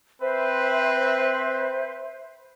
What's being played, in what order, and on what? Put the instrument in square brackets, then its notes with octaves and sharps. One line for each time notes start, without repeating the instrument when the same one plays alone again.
[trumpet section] C4 B4 [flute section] C5 E5